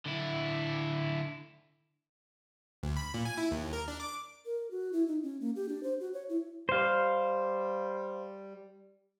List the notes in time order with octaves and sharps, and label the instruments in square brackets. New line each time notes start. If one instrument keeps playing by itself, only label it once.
[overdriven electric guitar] D3 E4
[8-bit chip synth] D2
B5
A#2
G#5
E4
D#2
A#4
D4
D6
[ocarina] A#4
F#4
E4
D#4
C#4
A#3
G4
D4
C5
F#4
C#5
E4
[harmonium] G3 [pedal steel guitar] C5 F5